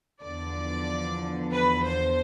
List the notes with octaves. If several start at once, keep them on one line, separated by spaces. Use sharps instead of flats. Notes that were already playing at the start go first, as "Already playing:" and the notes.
E2 D3 F3 D5
B4
C5